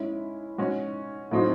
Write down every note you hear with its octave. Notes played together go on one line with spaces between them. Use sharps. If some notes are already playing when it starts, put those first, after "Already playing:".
Already playing: G#3 C#4 E4
G#3 C#4 F#4
A2 F#3 A3 C4 D#4